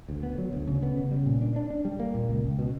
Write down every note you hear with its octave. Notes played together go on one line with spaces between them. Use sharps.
D2
B3
F#3
D2
C#3
B3
C#3
G3
A#2
D4
D4
D4
G3
A#3
A#2
C#2
C#2
B2